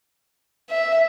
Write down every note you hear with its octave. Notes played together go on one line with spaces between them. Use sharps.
E5